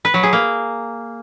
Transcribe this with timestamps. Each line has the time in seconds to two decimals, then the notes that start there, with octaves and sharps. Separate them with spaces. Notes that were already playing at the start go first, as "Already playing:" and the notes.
0.05 B4
0.14 F#3
0.23 G#4
0.33 A#3